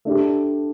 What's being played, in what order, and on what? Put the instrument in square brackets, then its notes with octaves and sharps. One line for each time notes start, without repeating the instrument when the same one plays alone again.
[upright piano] A3 D4 G4